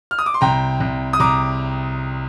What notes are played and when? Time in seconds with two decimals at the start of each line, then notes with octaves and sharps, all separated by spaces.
0.11 F6
0.19 D#6
0.26 D6
0.34 C6
0.41 C2 G5 A#5
0.80 C2
1.13 D#6
1.20 C2 A#5 D6